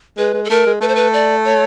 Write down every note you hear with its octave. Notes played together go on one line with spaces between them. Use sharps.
G#3 B4
G#3
A4
A3 A#4
G#3
A3 B4
C5
B4
D5
C#5